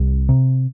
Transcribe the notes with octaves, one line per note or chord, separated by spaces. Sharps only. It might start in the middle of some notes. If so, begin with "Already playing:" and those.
Already playing: C2
C3